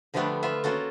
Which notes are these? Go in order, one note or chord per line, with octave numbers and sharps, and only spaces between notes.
D3 F3 G3 A3 B3 D4
B3 F4 E5
A#3 C#4 F4 F#4 A4